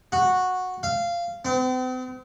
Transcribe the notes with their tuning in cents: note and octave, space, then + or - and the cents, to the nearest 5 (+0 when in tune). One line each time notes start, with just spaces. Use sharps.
F#4 -10
F5 -15
C4 -45